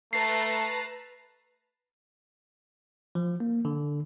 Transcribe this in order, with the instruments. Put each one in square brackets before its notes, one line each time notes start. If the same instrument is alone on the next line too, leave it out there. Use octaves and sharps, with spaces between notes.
[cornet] A3 [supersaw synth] B4 A5 A#5 [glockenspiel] C7
[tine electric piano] F3
A#3
D3